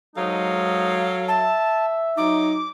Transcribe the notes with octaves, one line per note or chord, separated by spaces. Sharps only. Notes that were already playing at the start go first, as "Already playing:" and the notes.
G#2 F#3 G#3 D#4 A4 F5
E5 A5
F#3 D#4 D6